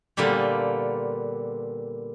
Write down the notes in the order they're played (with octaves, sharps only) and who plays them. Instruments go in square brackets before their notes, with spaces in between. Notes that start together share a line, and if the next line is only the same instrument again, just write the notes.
[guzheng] A#2 D3 G3 B3 F4